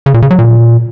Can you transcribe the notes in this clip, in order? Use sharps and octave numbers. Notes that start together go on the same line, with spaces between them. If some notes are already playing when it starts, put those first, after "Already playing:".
C#3
A#2
C#3
F#3
A#2